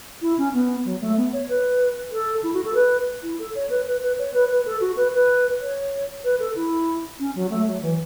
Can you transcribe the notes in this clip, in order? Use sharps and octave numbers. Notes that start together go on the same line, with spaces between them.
E4
C#4
B3
F#3
A3
B3
C#5
B4
A4
E4
F#4
A4
B4
E4
A4
C#5
B4
B4
B4
C#5
B4
B4
A4
F#4
B4
B4
C#5
B4
A4
E4
C#4
F#3
A3
F#3
E3